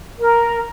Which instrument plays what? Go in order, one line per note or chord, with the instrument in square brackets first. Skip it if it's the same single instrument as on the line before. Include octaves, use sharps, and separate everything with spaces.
[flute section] A#4